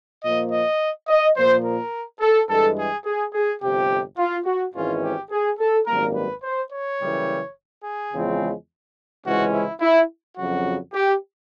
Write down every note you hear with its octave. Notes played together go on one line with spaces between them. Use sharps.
A#2 F3 A#3 D#5
D#5
D#5
A#2 F3 A#3 C5
A#4
A4
G2 E3 G#3 A4
G#4
G#4
G#4
G1 F2 C3 G4
F4
F#4
G#1 G#2 E3 G#3 C#4 F4
G4
G#4
A4
G#1 F#2 D#3 G3 A#3 A#4
B4
C5
C#5
F#1 F#2 C#3 E3 G3
G#4
E2 C#3 F3 G#3 C4
C#2 C3 E3 G#3 C#4 F#4
E4
E4
F2 C#3 F#3 F#4
G4